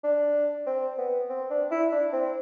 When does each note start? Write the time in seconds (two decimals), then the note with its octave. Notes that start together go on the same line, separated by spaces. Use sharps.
0.04 D4
0.67 C4
0.98 B3
1.29 C4
1.50 D4
1.71 E4
1.92 D4
2.13 C4